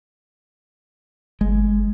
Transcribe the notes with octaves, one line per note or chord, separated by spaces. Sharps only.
G1 G#3